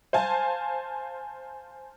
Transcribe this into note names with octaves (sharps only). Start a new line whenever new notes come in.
C5 F5 G#5 A5